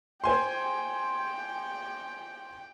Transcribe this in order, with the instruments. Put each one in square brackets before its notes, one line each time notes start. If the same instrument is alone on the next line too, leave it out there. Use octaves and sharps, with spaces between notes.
[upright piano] C5 G#5 C6 [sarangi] G5